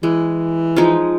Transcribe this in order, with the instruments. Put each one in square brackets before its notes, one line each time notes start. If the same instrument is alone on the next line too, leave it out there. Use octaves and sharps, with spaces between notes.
[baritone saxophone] E3 [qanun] G#3
[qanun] F3 G#3 D#4